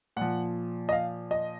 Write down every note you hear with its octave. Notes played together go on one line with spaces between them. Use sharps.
A#2 F3 F#5
D#5
F5
D#5